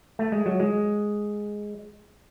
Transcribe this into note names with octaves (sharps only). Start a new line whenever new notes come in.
A3
G#3
F#3
G#3